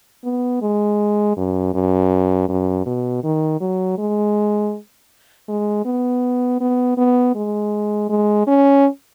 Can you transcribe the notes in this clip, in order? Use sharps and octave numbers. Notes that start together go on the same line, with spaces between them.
B3
G#3
F#2
F#2
F#2
B2
D#3
F#3
G#3
G#3
B3
B3
B3
G#3
G#3
C#4